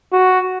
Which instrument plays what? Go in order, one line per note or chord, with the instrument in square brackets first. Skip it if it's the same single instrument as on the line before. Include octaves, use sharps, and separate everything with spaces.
[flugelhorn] F#4